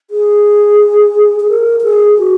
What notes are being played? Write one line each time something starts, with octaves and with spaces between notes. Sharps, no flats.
G#4
G#4
A#4
A#4
G#4
F#4